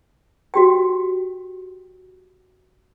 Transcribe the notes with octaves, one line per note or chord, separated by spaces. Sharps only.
F#4 G4 G5